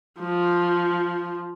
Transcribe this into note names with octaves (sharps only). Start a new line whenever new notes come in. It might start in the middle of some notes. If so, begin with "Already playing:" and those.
F3